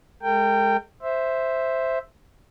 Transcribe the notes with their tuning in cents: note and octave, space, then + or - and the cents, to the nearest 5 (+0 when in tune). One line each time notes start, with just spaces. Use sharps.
G#3 +0 A#4 -40 G5 +0
C5 +0 E5 +0